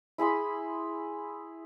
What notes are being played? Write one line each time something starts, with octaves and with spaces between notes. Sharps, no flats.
E4 G#4 B5 C6